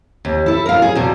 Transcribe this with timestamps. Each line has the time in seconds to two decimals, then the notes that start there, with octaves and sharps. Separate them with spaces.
0.25 D#2
0.46 E4 A4
0.66 A#4 F5
0.82 G#4
0.95 E2 B2